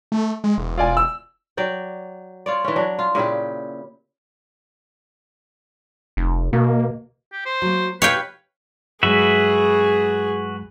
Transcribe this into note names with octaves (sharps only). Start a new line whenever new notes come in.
A3
G#3
E1
F4 D5 G#5
E6
F#3 D5 G5
F4 C#5 D5
E3 C#4
F#3 D4
F4
A#2 C#3 E4 G4
F1
B2 A#3
G4
C5
F#3 A#3
B2 G4 B4 C#5 F5 G5
G2 F#3 G#3 F#4 G#4 B4 E5